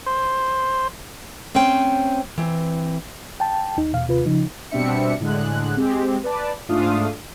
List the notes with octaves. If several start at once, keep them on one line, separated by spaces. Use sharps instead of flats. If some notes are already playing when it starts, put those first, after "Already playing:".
C5
A3 C4 C#4 C5 G5
E3 C4
G5 A5
D#2 D#4
E2 B2 F5
D#2 C3 F4 B4
C#3 F3 D#4
B2 G3 C4 D4 E5 C#7
A2 D3 G#3 F#6
G#3 C4 G4
B4 D5 A5
G#2 A3 D4 F4 F5 D#6